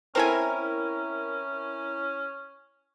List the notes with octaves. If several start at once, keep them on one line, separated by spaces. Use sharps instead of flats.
C4 C#4 E4 A4 A#4 G#5